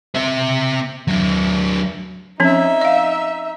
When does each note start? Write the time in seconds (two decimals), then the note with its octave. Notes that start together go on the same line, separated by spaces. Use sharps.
0.15 C4 E5
1.08 F#3 D4
2.40 F3 C4 C#4 D#4 E5
2.81 D#5 F5